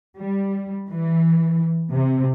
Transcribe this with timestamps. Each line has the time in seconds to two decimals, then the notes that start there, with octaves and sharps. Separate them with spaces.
0.18 G3
0.88 E3
1.92 C3